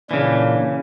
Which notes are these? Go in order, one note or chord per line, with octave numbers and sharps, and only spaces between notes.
A#2 C#3 E3 D4